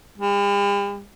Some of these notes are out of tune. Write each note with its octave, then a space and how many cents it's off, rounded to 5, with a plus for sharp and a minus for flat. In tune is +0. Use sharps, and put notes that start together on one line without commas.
G3 +45